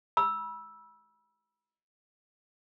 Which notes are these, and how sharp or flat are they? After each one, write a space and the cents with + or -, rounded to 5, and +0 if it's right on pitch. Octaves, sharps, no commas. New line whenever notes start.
B5 -30 E6 +0